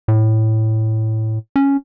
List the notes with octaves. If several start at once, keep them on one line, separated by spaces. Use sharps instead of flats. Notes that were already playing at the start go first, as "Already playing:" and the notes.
A2
C#4